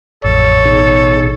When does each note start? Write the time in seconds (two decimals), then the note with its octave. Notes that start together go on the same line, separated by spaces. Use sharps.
0.24 A1 F2 A4 C#5 E6
0.65 B2 D#4 G#4